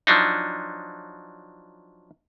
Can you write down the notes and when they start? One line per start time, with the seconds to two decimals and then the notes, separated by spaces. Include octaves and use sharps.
0.07 F3 F#3 D4 D#4